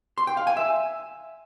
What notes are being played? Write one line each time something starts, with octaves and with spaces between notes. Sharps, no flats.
C6
G5
F5
G#5
E5